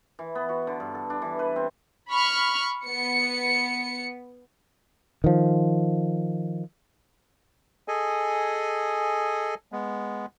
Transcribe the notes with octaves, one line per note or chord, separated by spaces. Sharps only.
E3
B3
F#4
D3
G2
A4
D4
E3
B4
C4
B5 C#6 F6
B3 C#7
D#3 F3
G#4 A4 D#5 G#5
G#3 B3